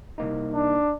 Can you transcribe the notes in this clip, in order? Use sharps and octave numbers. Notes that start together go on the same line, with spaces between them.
C2 A#3 D#4
D4